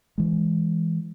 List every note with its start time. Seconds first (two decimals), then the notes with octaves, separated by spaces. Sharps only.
0.18 E3 G#3